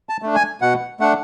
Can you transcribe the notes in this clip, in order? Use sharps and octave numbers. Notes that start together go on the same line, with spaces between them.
A5
A3 D4
G#5
B2 F#5
A3 D4 F#5